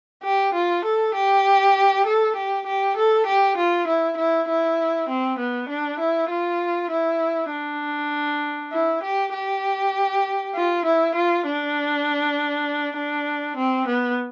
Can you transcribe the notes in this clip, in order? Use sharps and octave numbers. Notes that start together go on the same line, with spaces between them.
G4
F4
A4
G4
A4
G4
G4
A4
G4
F4
E4
E4
E4
C4
B3
D4
E4
F4
E4
D4
E4
G4
G4
F4
E4
F4
D4
D4
C4
B3